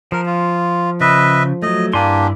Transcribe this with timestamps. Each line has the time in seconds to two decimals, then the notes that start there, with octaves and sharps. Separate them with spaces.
0.12 F3 A#4
0.26 F4
1.00 C#3 B4 D#5 E5
1.62 F#3 A3 D#5
1.93 G2 A#3 D4 E4 G4 D5 G#5 C6